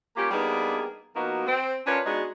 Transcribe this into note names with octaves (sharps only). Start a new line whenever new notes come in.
A#3 C#4 F4 G4
G3 A#3 B3 D4 D#4 G#4
F3 A#3 B3 D#4 F#4
C4
C#4 D4 F4 A#4 B4 C#5
G#3 B3 D4 D#4 F#4 G#4